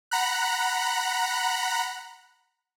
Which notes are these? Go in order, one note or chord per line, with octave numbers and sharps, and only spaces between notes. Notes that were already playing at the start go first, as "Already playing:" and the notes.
F#5 A#5 B5 F#6